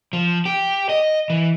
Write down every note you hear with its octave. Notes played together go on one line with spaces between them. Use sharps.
F3
G4
D#5
E3